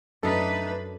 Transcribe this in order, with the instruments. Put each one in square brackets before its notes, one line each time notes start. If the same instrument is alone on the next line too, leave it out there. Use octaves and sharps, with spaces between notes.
[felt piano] F#2 [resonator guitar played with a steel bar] A3 D#4 [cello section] D4 B4 [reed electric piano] A4